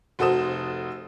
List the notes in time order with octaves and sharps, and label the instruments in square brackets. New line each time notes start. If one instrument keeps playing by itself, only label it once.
[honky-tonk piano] F1 F#4 A4 C5 D#6 E7